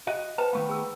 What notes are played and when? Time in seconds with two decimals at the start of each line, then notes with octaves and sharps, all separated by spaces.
0.07 F#4 D#5
0.38 B4 C5 G5 A5
0.53 D#3 A3 B3 F5
0.69 G#4 E6